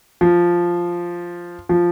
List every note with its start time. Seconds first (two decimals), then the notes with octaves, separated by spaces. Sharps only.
0.21 F3
1.69 F3